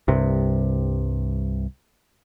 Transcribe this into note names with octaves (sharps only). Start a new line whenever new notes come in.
C2 G2 C3